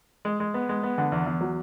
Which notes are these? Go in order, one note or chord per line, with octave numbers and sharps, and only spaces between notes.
G#3
G#3
B3
G#3
B3
D3
E2
E2
F#3